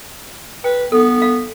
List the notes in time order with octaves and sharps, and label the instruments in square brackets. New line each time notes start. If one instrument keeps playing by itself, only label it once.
[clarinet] B4 [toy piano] G5
[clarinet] B3 [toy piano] A4
[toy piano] F5